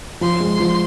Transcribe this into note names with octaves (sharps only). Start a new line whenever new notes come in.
F3 C6
G#3
F3